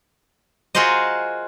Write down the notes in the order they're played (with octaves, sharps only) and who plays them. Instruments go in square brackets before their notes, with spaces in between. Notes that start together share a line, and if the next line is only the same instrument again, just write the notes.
[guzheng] F4 F#4 G#4 A#4 C5 D#5